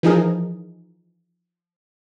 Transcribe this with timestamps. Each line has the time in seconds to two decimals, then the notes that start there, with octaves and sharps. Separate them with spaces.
0.03 E3 F3 D#4 G#4 A#4